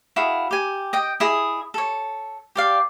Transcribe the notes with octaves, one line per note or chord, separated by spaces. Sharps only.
E4 F#4 G#4 F5
G4 G#5
D#5 G5
E4 G#4 D#5
A4 C#5
G4 D5 F5